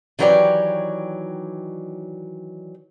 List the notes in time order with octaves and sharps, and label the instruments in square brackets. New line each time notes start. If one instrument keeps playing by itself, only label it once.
[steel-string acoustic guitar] D#3 E3 F#3 G4 C#5 D5